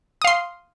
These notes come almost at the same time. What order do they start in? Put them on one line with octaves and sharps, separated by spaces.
D#6 F5 C6